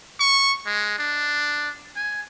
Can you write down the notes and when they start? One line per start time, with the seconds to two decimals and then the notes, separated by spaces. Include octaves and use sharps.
0.20 C#6
0.66 G#3
0.99 D4
1.96 G#5